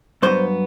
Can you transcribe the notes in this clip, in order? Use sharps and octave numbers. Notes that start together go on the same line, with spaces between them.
G2 F#3 B3 C5